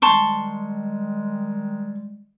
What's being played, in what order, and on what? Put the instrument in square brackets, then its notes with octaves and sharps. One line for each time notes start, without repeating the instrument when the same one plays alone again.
[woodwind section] D#3 G3 G#3 [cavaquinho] A5 C6 C#6